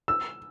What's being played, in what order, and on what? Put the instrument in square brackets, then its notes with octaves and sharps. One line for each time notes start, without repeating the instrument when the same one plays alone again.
[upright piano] E6